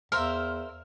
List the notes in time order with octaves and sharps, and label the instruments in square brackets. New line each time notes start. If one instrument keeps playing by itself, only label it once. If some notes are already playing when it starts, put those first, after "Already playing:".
[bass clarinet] E2 [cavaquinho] A#4 C5 E5 [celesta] F5 C6 E6 [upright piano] F6